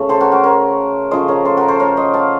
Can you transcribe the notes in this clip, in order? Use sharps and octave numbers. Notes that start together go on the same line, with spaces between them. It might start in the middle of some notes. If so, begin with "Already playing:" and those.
Already playing: C#3 A3
A4 C5
F#4 A#4
F#4 A#4
A#4 C#5
C#3 F3 A3 C5 D#5
A#4 C#5
A4 C5
F#4 A#4
A4 C5
A#4 C#5
C5 D#5
F5 A5